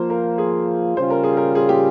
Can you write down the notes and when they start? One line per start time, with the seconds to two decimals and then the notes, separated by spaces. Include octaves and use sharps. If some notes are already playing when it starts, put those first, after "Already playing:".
Already playing: F3 A#3 F4 C5
0.10 A#4
0.38 G#4
0.97 C#3 G3 C#4 F4 C5
1.10 A#4
1.23 G#4
1.37 A#4
1.55 G#4
1.69 G4